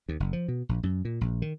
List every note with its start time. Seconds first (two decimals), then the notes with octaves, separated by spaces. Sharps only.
0.09 D#2
0.20 F#1
0.33 F3
0.48 B2
0.69 A#1
0.83 F#2
1.05 A#2
1.21 A#1
1.42 D#3